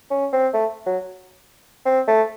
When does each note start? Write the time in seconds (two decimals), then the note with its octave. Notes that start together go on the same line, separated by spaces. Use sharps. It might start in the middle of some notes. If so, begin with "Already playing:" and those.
0.11 C#4
0.33 C4
0.54 A3
0.86 F#3
1.86 C4
2.07 A3